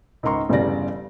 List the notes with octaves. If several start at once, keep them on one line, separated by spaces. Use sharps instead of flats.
C#2 G#2 A#4 A#5 C6 C#6
G1 E2 C#3 G3 D5 A#6